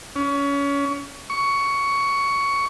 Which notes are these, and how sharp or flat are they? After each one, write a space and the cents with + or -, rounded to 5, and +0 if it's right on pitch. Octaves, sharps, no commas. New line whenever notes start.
C#4 +25
C#6 +10